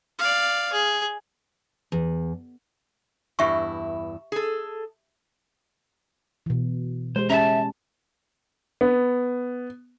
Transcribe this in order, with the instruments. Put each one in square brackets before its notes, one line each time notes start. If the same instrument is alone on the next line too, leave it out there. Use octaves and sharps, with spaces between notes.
[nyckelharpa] D5 F5
G#4
[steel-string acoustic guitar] E2
[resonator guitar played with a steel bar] E2 G2 E4 [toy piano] G4 E5 C#6
[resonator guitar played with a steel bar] G#4 A4
[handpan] B2 E3
[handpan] G#3 G4 [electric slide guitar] C5
[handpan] C#4 G4 [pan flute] E5 [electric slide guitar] A5 A#5
[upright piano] B3